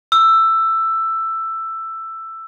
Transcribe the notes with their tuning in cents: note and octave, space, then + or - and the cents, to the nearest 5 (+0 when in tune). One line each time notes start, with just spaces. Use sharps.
E6 +10